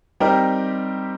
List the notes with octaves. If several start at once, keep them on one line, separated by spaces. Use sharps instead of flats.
G3 C4 D#4 G4 A#4